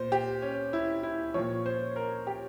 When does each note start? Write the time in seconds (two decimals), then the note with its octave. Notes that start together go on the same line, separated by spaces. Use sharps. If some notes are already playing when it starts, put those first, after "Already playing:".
Already playing: A#2 C5
0.12 G4
0.42 C#4
0.73 E4
1.03 E4
1.34 A#2 F3 C#5
1.66 C5
1.96 A#4
2.27 G4